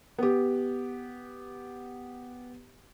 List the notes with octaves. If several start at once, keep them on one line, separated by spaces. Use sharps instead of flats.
B3 G4